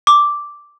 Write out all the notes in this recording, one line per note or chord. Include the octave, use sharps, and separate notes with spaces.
D6